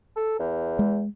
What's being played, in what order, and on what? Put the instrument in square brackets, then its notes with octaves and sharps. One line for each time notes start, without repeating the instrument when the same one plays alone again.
[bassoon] A4
E2
[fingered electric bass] G#3